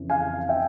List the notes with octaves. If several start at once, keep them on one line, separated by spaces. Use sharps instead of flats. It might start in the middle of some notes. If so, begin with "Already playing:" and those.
Already playing: F2 C#3 E3
F5 G#5
E5 G5